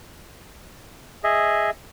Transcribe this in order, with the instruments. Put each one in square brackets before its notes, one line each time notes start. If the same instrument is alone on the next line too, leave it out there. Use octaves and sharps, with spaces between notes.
[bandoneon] G#4 D#5 E5